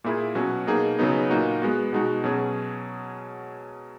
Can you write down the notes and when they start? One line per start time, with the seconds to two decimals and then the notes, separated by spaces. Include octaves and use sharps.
0.04 A#2 A#3 E4 G#4
0.35 B2 F#3 C#4 F#4
0.67 B2 A#3 D#4 G#4
0.99 C#3 F#3 B3 D#4
1.30 A#2 A#3 D#4 F#4
1.62 G#3 B3 F#4
1.93 B2 G#3 D#4 F#4
2.24 B2 F#3 C#4 G#4